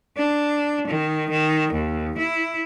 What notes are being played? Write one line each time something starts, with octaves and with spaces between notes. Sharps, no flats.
D4
D#3
D#3
D#2
E4